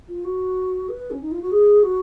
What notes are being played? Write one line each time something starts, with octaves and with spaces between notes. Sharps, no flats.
F4
F#4
B4
C#4
D#4
F4
F#4
G#4
F#4